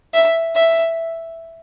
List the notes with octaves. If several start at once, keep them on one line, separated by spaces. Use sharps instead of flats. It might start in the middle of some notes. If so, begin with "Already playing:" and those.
E5
E5